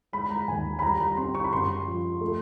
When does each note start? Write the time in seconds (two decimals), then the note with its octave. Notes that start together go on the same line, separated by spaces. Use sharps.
0.13 G#3 B5
0.30 A#5
0.48 D#2 G#5
0.79 B5
0.82 G3 A#5
1.01 A#5
1.17 C4 C6
1.35 C#6
1.44 B5
1.52 F#2 C6
1.86 F3
2.21 A3